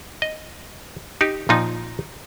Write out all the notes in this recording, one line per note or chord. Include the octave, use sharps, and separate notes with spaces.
D#5
D#4 G4
A#2 F3 D#4